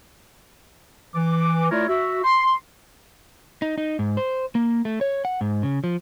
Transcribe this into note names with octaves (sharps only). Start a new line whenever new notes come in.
E3 D6
A3 E4 F4 A#4 C#5 D5
F#4 E5
C6
D#4
D#4
G#2
C5
A#3
A3
C#5
F#5
G#2
C#3
F3